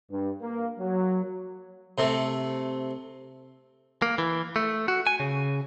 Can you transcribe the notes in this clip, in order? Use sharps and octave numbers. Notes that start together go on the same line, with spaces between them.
G2
A#3
F#3
C3 A3
A#3
E3
A3
F#4
G#5
C#3